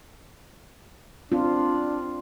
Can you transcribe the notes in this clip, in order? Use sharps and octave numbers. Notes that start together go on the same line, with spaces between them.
C4 D4 F4